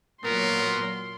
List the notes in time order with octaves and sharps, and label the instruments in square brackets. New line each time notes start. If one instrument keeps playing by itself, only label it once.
[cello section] A#2 F#3 [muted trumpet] B3 [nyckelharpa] A#4 [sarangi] C6